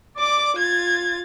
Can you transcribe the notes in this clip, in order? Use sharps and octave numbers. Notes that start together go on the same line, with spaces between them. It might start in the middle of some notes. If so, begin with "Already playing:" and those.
D5 D6
F4 G#6 A6